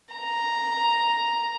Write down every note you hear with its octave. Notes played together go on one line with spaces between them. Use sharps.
A#5